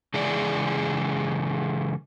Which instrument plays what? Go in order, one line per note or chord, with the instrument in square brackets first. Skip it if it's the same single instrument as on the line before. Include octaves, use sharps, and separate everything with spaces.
[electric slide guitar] C#3 E3 G#3 G#4 D5